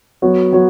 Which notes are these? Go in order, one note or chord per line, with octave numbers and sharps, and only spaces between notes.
F#3 B3 F#4 C#5
F#3 B3 F#4 C#5